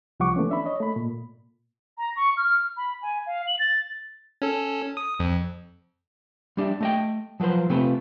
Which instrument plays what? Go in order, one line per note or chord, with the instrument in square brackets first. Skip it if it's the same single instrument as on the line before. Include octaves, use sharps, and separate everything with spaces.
[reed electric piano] C2 F3 G3 F#5 C#6 D6
E3 A3 B3 C#4
D4 E5 B5
C#5 D#5
A3 B5
A#2
[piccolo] A#5
C#6
F6
B5
G#5
F5
F#7
A6
[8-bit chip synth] C#4 A4
D#6
F2
[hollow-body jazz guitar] G3 D4 G4 E5
A3 D#5 G5
F3 F#3 F4 B4 C5
C3 A3 C4 F4 B4 C5